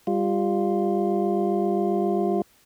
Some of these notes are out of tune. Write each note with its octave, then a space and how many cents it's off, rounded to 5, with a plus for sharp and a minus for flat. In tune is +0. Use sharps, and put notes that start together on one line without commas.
G3 +20 F4 +0